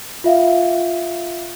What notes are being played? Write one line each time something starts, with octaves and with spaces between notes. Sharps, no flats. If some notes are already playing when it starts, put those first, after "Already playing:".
F4 E5 F5